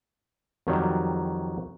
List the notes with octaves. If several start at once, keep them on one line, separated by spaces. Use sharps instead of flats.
F2 D#3 F#3 G3